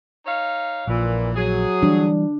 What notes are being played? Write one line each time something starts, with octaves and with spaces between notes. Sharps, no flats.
D#4 C#5 F5
A#1 A#2 E3
F#3 G#4
E3 G3 D4